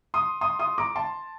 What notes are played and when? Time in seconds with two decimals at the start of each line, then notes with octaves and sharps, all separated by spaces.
0.14 C6 D#6
0.41 C6 D#6
0.59 C6 D#6
0.78 A#5 D6
0.96 A5 C6